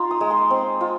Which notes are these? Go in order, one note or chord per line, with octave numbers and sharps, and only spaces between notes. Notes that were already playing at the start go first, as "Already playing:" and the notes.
Already playing: D#4 F4 A#5 C6
D#6
G#3
C6
C4
F4